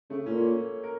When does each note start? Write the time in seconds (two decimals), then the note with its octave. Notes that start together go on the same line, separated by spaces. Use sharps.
0.10 C#3 A3
0.26 A2 C#4
0.30 A#2 A#3
0.51 C#4
0.84 A#4